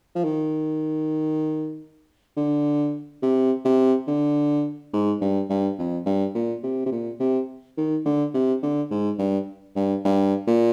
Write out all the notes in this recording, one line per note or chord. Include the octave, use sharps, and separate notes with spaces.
F3
D#3
D3
C3
C3
D3
G#2
G2
G2
F2
G2
A#2
C3
C3
A#2
C3
D#3
D3
C3
D3
G#2
G2
G2
G2
A#2